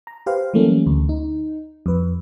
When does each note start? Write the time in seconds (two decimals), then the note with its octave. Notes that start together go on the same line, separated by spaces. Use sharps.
0.07 A#5
0.26 G4 B4 C5 F5
0.54 E3 F#3 G3 A3 A#3 C#4
0.86 D2
1.09 D#4
1.86 F2 B4